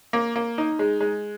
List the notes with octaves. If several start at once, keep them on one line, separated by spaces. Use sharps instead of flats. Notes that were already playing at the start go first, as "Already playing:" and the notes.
A#3
A#3
D#4
G#3
G#3